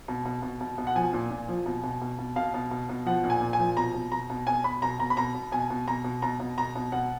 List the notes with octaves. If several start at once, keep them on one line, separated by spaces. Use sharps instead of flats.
B2
B2
B2
B2
B2
F#5
F3 G#5
A#2
A#2
F3
B2
B2
B2
B2
B2 F5
B2
B2
B2
F3 F#5
A#2
G#5
A#2
G#5
F3
B2 A#5
B2
B2 A#5
B2
B2 G#5
B2 B5
B2 A#5
B2 A#5
B5
B2 A#5
B2
B2 G#5
B2
B2 A#5
B2
B2 A#5
B2
B2 A#5
B2
B2 F#5